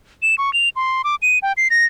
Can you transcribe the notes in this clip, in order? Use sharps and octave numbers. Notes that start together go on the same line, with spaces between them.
E7
C#6
F7
C6
D6
D#7
G5
C7
A#6